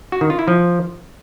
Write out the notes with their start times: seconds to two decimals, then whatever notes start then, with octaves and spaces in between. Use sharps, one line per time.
0.12 F#4
0.21 D#3
0.30 F4
0.39 E4
0.48 F3